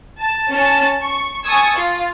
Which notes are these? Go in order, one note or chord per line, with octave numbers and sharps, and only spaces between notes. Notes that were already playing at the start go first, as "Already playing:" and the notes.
A5
C#4 A5
C#6
G#5 A5 C#6 D#6 E6 G#6
F4